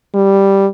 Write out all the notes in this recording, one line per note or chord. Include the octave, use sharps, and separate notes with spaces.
G3